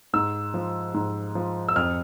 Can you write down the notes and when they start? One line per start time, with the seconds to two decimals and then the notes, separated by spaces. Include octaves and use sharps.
0.13 G#2 E6
0.54 F3
0.94 G#2
1.35 F3
1.69 E6
1.76 F2 F6